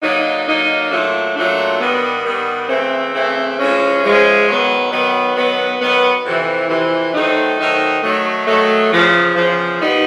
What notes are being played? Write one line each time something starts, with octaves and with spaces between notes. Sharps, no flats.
D3 F#3 A#3 D#4
D3 F#3 A#3 D#4
A#2 F#3 A3 D4 F4
A#2 F#3 A3 D4 F4
G2 D#3 G3 B3
G2 D#3 G3 B3
C#3 E3 A3 C4
C#3 E3 A3 C4
A2 F3 G#3 C#4
A2 F3 G#3 C#4
D#3 F#3 B3
D#3 F#3 B3
D#3 F#3 B3
D#3 F#3 B3
F2 C3 E3
F2 C3 E3
D#3 F#3 A3 C4 D#4
D#3 F#3 A3 C4 D#4
D#3 F#3 A3
D#3 F#3 A3
E2 C#3 F3
E2 C#3 F3
A#2 G3 B3 D#4